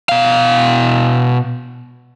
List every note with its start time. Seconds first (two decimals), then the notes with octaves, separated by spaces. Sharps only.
0.09 B2 F5